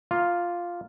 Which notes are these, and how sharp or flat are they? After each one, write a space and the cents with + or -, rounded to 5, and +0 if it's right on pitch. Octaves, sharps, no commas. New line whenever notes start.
A#3 +0 F4 +0